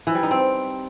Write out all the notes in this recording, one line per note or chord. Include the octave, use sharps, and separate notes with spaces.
E3
G3
D#4
C4